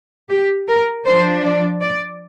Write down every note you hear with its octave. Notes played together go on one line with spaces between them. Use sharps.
G4
A#4
F3 D4 C5
D5
D5